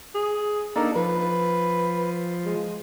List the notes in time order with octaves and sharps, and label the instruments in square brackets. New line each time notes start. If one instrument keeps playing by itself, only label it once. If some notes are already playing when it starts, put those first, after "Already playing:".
[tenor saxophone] G#4
[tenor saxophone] A#3 [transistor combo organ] D4 D#4 A4
[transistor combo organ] F3 [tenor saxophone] B4
[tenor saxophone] G#3